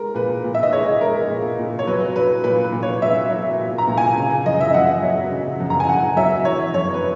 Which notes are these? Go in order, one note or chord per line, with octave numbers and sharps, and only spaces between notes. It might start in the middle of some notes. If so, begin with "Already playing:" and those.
Already playing: G#3 A#4
A#2 B4
A#2
E5
D#5
G#3 C#5
G#3 A#4
A#2
A#2
C#5
F#3 B4
F#3 B4
A#2 B4
B4
A#2
C#5
F#3 E5
F#3
A#2
A#5
A#2
G#5
C#3
F#2 D#5
E5
F#2 F#5
F#3
C#3
F#2
A#5
G#5
F#2 F#5
F#3 E5
E3 C#5
F#2 C#5
B4